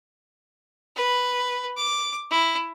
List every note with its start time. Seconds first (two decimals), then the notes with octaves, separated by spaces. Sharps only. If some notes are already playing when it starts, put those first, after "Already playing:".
0.96 B4
1.78 D6
2.31 E4